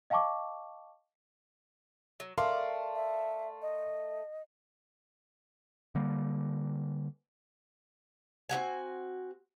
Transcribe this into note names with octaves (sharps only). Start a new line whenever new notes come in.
D#5 F5 G5 A5 C#6 D6
F#3
A3 A#4 D5 F5 C6
E5
D#5
D3 G3 A#3
C4 E4 F#4 G#5